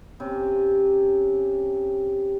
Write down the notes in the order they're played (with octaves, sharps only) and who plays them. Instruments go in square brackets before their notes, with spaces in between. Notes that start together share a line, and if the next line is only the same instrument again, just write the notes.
[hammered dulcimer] C3 C#4